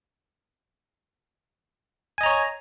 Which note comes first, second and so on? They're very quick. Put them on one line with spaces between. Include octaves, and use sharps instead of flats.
G#5 D#5 A#5 C#5